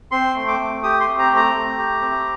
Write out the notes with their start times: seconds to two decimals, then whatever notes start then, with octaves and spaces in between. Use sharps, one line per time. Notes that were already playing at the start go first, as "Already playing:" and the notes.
0.11 C4 C6
0.35 A3
0.48 D6
0.59 A3
0.83 G4 D#6
1.00 C6
1.07 C4
1.19 A#5
1.31 A3
1.36 A#5
1.54 A3
1.78 G4
2.01 C4